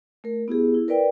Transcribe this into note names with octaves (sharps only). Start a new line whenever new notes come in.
A3 A#4
B3 E4 G4 G#4
E4
A#4 B4 D5 G5